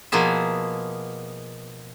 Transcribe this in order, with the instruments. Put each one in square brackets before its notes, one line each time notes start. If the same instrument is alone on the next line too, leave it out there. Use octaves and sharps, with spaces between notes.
[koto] B2 F3 A#3 B3 G#4 E5